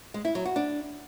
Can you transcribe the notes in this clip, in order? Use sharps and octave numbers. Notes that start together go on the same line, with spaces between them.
G#3
E4
F#3
F#4
D4